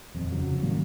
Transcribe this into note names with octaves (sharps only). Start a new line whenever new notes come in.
D#1 F2
F1 C#3 F#3
A2 D#3 G3 A#3